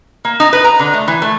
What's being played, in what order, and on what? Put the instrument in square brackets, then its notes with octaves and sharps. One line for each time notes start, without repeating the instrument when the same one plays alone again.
[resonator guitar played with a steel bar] A#3
D#4
B4
A#5
D3
A3
E3
A3